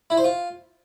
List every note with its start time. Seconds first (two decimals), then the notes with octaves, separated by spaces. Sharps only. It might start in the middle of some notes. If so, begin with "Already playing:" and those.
0.10 E4
0.17 C5
0.24 F4